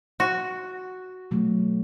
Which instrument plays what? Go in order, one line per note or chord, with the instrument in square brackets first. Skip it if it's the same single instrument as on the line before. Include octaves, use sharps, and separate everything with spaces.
[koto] F#4
[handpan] B2 F#3 A3